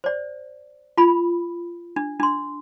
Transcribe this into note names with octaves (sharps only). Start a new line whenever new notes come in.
C5 D5
F4 B5
D4
D4 C6